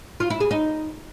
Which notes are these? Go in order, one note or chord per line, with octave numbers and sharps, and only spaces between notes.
F4
E4
G#4
D#4